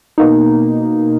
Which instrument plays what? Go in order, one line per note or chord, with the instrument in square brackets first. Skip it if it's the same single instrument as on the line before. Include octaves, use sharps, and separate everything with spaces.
[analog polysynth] B2 A#3 D#4